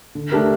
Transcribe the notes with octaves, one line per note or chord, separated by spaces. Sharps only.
D3
A3 D4 G4 A#4